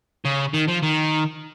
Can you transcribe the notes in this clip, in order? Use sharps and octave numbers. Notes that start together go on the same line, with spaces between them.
C#3
D#3
F3
D#3